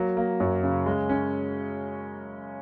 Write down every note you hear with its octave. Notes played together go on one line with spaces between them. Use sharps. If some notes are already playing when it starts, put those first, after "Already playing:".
Already playing: F#3 A#3
A#3
F#2
C#3
G#3
C#4